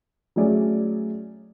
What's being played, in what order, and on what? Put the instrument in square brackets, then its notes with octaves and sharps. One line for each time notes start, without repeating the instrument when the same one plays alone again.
[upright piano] F#3 A3 C#4 G#4 D5